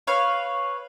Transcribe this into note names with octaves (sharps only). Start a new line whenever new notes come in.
B4 C#5 F5